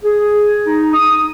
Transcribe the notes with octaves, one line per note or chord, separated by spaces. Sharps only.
G#4
D#4
D#6